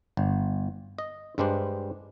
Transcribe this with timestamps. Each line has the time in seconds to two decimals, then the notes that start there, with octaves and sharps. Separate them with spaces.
0.17 G1
0.98 D#5
1.38 G2 G3 G#3 D4 C5